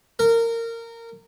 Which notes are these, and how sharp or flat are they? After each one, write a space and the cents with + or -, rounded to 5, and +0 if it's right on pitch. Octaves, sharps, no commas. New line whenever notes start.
A#4 -20